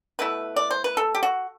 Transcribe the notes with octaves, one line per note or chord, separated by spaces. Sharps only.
B2 A3 E4 B4
D5
C5
B4
A4
G4
F#4